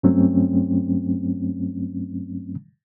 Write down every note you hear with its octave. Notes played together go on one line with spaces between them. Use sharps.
G2 F#3 A3 C4 C#4